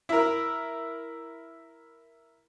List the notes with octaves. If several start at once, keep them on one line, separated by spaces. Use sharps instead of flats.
E4 A#4